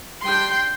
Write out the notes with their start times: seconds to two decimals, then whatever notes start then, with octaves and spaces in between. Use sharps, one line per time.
0.24 G3 D4 G5 C6